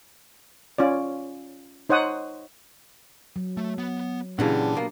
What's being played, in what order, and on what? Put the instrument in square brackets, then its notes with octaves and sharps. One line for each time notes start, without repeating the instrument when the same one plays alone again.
[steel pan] C#4 F4 D5
D#4 C5 C#5 F#5 D#6
[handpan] F#3
[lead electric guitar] A3
B3
[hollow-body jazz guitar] A#2 C#3 E3 [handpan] D4 G4 [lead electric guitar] F#5 A5
[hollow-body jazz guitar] B2 A#3